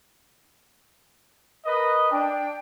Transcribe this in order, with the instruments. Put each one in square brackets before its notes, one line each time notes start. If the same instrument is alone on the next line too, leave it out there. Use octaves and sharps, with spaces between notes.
[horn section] A#4 B4 D#5
[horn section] D4 [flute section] G5